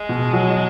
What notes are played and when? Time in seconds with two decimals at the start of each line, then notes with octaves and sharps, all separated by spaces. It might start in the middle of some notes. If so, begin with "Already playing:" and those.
Already playing: G#3
0.09 B2
0.33 F#3